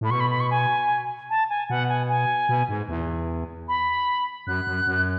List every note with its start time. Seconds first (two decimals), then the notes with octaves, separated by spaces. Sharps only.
0.01 A2 B5
0.10 B2 C#6
0.20 B5
0.30 B5
0.40 C#6
0.51 G#5
1.30 A5
1.50 G#5
1.69 B2 F#5
1.89 G#5
2.09 G#5
2.49 B2
2.69 G#2
2.88 E2
3.68 B5
4.47 F#2 F#6
4.67 F#2
4.87 F#2